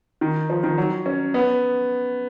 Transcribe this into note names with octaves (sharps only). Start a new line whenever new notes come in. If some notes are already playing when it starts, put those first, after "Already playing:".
D#3
F3
D#3
F#3
C#4
B3